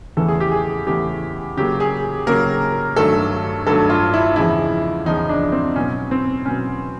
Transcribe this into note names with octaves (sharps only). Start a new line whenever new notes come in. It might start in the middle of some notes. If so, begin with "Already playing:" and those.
E2 C#3 E3 A3 A4
G#4
G4
G#4
E2 C#3 E3 A3 G4
C#3 F#3 A#3 G4
G#4
C#3 F#3 A#3 A#4
G2 D#3 F#3 A3 A4
G2 D#3 F#3 A3 A4
F4
E4
E2 C#3 F3 G#3 E4
E2 C#3 F3 G#3 D#4
D4
C4
B2 F#3 B3 C#4
C4
B2 F#3 B3 C#4